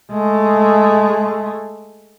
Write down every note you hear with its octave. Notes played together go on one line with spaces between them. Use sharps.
G#3 A3